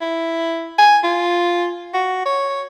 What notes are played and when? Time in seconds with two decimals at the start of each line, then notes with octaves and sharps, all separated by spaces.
0.01 E4
0.78 G#5
1.04 F4
1.94 F#4
2.26 C#5